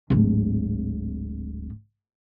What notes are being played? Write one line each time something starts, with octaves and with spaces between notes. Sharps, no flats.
D1 G#1